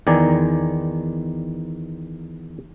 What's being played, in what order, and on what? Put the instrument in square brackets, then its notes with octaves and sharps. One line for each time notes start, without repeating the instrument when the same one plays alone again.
[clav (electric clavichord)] E2 D#3 D5 G#5 A#5